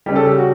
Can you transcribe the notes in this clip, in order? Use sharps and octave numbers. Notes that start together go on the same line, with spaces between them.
C#3 G3 G4
A4
G4
F#4